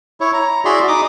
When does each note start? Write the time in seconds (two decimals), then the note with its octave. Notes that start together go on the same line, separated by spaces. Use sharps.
0.20 E4 C#5
0.33 A#5
0.65 E4 F#4 G#4 D5 B5 C6
0.88 D#4 D6 D#6